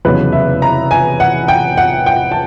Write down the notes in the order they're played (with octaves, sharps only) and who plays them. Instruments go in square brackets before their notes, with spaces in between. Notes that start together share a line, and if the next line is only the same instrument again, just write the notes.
[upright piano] F1 E2 C#3 F#3 B3 B4
E5
A#5
G#5
F#5
G5
F#5
G5
A5